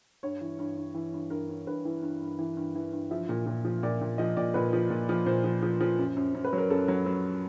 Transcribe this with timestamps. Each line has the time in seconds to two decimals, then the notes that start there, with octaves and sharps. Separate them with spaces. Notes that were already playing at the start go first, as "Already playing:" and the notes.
0.23 G2 C#5
0.41 E3
0.59 G2
0.77 G2
0.95 E3
1.13 G2
1.30 G2 A#4
1.49 G2
1.67 G2 B4
1.85 E3
2.03 G2
2.21 G2
2.39 E3
2.57 G2
2.75 E3
2.92 G2
3.11 F3 E5
3.29 A#2
3.46 A#2
3.65 F3
3.83 A#2 D5
4.01 A#2
4.18 F3 D#5
4.37 A#2 D5
4.54 A#2 B4
4.73 F3
4.90 A#2
5.09 F3
5.26 A#2 C5
5.44 F3
5.62 F3
5.80 F3
5.98 F#2
6.16 F#2
6.34 F#2
6.45 B4
6.53 F#3
6.58 A#4
6.70 F#2 A4
6.88 F#3
7.06 F#3